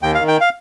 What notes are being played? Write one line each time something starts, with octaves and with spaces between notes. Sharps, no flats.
D#2 G5
F5
D#3
G5
F5